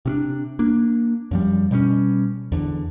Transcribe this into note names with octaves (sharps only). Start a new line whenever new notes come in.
C3 C#4 D4
A#3 D4
F#2 F3 G3
B2 G3 B3 C#4
E2 D3